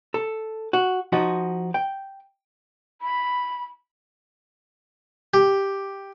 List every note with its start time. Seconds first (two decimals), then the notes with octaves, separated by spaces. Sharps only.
0.14 A4
0.73 F#4
1.12 F3 D#4 F#4
1.74 G5
3.01 B5
5.34 G4